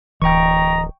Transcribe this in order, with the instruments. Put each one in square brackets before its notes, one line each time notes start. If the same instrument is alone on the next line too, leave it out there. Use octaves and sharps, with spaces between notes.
[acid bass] D1 [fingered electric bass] E3 [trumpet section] D#5 A#5 [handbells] G5 C#6